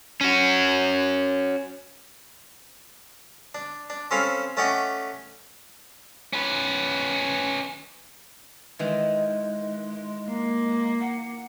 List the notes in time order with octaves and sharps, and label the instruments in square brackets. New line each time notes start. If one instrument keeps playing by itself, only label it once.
[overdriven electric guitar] C#4 F#4
[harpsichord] D4
D4
C4 C#4 A4 F5 B5
A3 C#4 D5 D#5 F#5 G5
[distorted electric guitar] C#4 B4
[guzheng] D#3 E3 [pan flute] G#3
[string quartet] A#3
[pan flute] F#5